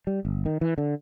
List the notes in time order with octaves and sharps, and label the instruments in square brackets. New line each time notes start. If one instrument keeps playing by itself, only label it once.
[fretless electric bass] G3
G1
D#3
E3
D3